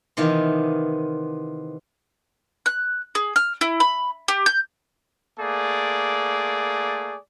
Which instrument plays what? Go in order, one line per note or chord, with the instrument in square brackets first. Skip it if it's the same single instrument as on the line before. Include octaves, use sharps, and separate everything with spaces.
[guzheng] C3 D#3 E3 B3 F4
[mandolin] F#6
G#4
F6
E4
B5
G4
G6
[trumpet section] A3 A#3 G#4 D5